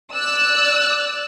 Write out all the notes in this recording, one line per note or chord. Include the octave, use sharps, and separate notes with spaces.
D5 E6 F#6